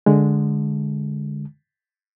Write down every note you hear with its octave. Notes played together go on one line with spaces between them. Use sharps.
D3 G#3